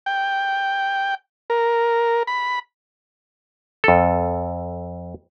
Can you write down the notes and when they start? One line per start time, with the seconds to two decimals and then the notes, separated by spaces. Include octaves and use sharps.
0.06 G5
1.50 A#4
2.27 B5
3.84 F2 A4